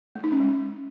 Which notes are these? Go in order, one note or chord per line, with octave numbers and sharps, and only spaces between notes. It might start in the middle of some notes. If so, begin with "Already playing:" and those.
A3
D#4
C#4
G#3